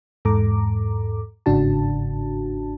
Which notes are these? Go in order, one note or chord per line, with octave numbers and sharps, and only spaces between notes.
E2 G#2 A4 A#5 D6
G1 G#2 C#3 D4 F#4 A5